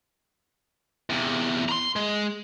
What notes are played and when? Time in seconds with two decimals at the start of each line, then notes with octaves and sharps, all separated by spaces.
1.10 E2 C3
1.69 A#5 C6
1.96 G#3